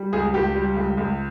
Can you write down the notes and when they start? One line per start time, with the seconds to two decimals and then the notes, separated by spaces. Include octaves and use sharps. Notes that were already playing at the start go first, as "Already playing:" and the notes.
Already playing: G3
0.13 C#2 G#4
0.34 C#2 G4
0.55 G3
0.76 C#2
0.97 C#2